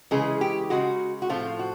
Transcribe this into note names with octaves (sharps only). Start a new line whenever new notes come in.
C#3 E3 G#3 G#4
G4
C#3 E3 G#3 F#4
F#4
A2 F3 A3 C4 F4
F#4